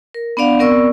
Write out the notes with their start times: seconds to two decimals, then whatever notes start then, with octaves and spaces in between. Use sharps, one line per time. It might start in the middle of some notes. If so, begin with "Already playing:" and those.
0.14 A#4
0.37 B3 D4 D5 F5 F#5
0.59 B3 C4 A#4 D5 C#6 E6